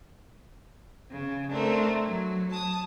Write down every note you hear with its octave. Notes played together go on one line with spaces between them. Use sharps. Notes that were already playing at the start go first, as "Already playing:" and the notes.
C#3
A3 C4 D4 A#4
F#3
A5 D#6